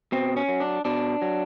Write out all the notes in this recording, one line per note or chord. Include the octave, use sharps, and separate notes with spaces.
B2 C4
C#4
F#3
D4
B2 D4
F#3